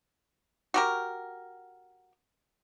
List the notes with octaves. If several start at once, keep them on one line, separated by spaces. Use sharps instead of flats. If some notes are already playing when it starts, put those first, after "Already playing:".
F#4 G4 A#4